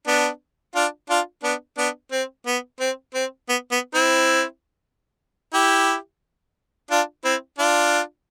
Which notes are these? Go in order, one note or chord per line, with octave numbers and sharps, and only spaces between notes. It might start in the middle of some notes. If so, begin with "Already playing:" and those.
B3 D4
D4 F4
D4 F4
B3 D4
B3 D4
C4
B3
C4
C4
B3
B3
C4 E4
E4 G4
D4 F4
C4 E4
D4 F4